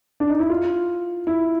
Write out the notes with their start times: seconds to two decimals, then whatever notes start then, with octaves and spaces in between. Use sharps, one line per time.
0.20 D4
0.30 D#4
0.39 E4
0.50 F4
1.27 E4